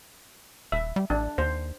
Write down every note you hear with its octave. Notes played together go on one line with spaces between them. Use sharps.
D#1 E5
G3
A1 D4
D#2 C5